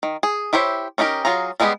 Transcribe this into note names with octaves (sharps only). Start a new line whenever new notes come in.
D#3
G#4
E4 G4 C5 C#5 E5
C#4 D#4 F4 G4 A#4
F#3 F4 G#4 A#5
G3 G#3 B3 G4 G#4